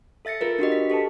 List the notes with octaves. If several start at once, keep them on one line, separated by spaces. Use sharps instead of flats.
A4 E5 A6 A#6 C#7
F4 G#4 A#4 B4
D4 F#4 G4 D#5
B6
G4 A4 B4 A5